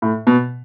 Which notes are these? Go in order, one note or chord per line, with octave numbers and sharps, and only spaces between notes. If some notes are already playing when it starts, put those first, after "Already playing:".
A2
B2